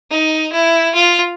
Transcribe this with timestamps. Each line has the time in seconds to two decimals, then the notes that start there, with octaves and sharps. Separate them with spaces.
0.10 D#4
0.52 E4
0.94 F4